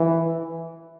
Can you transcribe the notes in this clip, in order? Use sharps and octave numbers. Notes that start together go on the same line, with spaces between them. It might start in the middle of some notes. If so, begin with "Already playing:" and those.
Already playing: E3